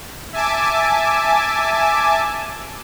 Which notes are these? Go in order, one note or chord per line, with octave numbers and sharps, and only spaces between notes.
E5 G#5 A5 D6